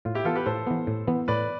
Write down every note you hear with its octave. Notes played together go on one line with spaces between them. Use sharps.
A2 F4
E4 G4
E3 B3 F4 A4
G4 B4
A2 A4 C5
E3 B3
A2
E3 B3
A2 B4 D5